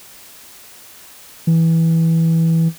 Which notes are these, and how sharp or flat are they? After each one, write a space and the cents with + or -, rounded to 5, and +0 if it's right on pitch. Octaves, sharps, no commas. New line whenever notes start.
E3 -10